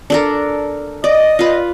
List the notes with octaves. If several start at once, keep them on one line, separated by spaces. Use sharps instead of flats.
D4 A4 A#4
D5 D#5
F4 B4